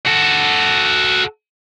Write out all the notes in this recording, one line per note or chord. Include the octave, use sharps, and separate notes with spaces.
F#4 A4